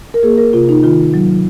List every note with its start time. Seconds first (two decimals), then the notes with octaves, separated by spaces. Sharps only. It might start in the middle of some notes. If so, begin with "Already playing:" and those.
0.14 A#4
0.23 A#3 G#4
0.38 A#4
0.53 C3 F4
0.69 D#4
0.83 D#3 F4
1.14 F#3